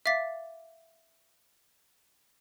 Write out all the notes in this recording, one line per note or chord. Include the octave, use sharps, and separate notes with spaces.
E5 F5 D6 A6 B6